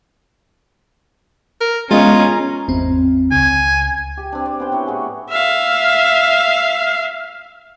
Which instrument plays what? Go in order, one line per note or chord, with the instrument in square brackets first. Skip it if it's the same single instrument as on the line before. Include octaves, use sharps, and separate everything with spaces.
[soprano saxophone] A#4
[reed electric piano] G#3 B3 D#5 [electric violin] C#4 [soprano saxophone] F4 [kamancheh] A#5
[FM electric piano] G#1 E2 C4
[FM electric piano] C#2 C#3 [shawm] G#5
[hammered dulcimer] G4
C4 D4
D5
B3 C#4 C5 G5
D4 E4 C#5
A2 F#4 G#4
[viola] E5 F5